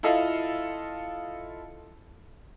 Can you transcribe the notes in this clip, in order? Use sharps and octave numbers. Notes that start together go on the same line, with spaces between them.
E4 F4 A4 D#5 F5